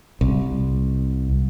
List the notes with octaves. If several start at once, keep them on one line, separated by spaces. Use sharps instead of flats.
C2